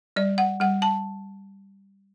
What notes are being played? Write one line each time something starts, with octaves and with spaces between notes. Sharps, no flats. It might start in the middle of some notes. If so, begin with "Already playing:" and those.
G3 D5
F#5
G3 F#5
A5